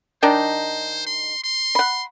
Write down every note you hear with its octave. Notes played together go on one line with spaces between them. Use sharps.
D#3 D4 D#4 C5
C6
C6
F#5 B5